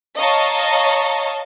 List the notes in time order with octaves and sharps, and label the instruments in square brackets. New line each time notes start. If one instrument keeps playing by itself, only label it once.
[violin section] C#5 D#5 F5 A5 A#5 C#6